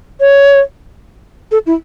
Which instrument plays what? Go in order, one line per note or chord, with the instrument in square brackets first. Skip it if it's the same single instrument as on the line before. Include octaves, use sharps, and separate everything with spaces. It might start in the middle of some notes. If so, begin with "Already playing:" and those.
[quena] C#5
A4
E4